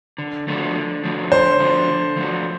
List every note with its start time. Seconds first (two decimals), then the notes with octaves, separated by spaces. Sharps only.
0.18 D3
0.48 F3 A3 D4 F#4
0.75 D3
1.04 F3 A3 D4 F#4
1.32 D3 C5
1.60 F3 A3 D4 F#4
1.88 D3
2.17 F3 A3 D4 F#4